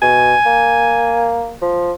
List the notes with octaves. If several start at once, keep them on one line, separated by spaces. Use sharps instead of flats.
B2 G#5
A#3
F3